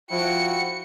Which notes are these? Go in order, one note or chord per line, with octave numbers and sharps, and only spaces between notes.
F3 E4 F#4 G5 C#7